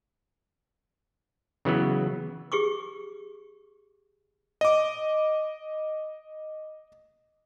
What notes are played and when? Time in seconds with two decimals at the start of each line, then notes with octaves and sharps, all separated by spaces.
1.65 C#3 E3 F#3 B3
2.52 G4 G#4 C#6 D6
4.61 D#5 D6